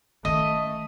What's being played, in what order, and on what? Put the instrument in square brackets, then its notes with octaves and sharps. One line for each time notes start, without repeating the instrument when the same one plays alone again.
[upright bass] D#3 C#4 [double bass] A3 [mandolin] D#5 [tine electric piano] D#6